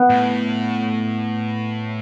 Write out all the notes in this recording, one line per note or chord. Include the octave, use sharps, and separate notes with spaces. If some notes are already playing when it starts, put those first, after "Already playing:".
Already playing: B3
A2